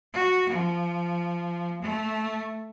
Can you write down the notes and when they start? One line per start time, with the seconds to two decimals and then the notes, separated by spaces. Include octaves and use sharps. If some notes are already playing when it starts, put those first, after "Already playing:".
0.14 F#4
0.49 F3
1.82 A3